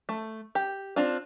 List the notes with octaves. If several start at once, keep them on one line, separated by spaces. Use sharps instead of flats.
A3
G4
C4 D4 F4